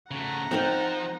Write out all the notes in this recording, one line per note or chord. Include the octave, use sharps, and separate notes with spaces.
C#3 A3 F#5 A#5
F3 C4 D#4 A#4